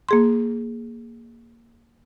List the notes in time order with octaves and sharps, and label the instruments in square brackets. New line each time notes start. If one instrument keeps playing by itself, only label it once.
[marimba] A#3 G#4 C6